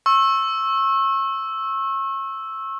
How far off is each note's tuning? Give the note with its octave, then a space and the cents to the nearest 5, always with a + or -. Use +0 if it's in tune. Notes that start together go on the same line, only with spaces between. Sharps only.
C#6 -35 E6 +0